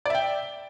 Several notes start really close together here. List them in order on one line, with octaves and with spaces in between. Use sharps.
D5 E5 G5